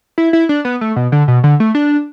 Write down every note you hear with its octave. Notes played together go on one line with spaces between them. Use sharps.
E4
E4
D4
B3
A3
B2
D3
B2
D3
A3
D4